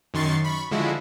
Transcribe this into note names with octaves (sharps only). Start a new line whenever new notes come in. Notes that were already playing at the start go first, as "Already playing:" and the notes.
F#2 D#3 C6 C#6 A6 C7
B5 C#6
D3 F3 G#3 E4 F#4